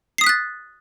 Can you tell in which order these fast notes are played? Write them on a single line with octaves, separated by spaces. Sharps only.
C7 D#6 B6 F#6 A6